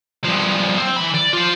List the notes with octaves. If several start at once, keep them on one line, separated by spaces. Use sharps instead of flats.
G2 F3
C4
E3 B5
D5
F4 C5